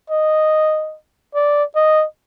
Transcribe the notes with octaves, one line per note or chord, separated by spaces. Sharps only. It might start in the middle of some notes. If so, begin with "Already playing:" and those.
D#5
D5
D#5